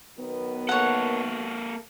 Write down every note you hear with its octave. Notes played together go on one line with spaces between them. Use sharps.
D#3 F#3 B3
A#3 A4 C#5 F#5